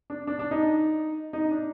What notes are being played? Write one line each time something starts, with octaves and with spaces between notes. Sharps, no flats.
D4
D4
D4
D#4
D#4
D4